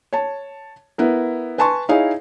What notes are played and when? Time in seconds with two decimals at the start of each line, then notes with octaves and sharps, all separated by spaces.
0.13 C#5 A5
0.98 B3 E4 A#4
1.58 B4 G#5 A5 C6 C#6
1.89 D#4 E4 G#4 C#5 D#5 F5